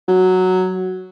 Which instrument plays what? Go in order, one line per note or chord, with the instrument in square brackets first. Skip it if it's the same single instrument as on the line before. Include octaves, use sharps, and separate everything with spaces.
[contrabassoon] F#3